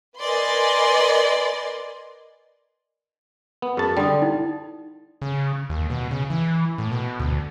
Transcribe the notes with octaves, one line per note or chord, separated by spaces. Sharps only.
A#4 B4 D5 D#5 G#5 C6
B3
F#2 G#4 A5
D3 G3 G5 C6 D#6
D#4 E4
C#3
D#2
B2
C#3
E3
A2
B2
D2